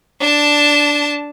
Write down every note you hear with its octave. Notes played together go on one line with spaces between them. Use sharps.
D4 A5